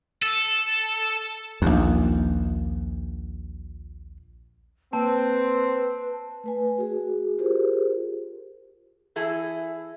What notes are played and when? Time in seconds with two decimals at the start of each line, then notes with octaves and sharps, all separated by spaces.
0.22 A4
1.62 A#1 D#2
4.93 A#3 C4 B4 A5
6.44 A3 B4 G#5
6.78 F#4 G#4
7.38 F4 G4 G#4 A#4 C5
9.16 E3 E4 G#4 A4